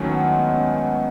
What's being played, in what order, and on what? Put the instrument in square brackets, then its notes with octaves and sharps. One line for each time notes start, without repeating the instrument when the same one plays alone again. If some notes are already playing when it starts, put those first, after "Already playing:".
Already playing: [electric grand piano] D#2 D#3 F#3 A3 E4 [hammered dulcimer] C#4
[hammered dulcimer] B3
G#3
B3
C#4
B3